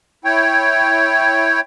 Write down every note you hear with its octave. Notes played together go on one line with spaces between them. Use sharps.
E4 C#5 G5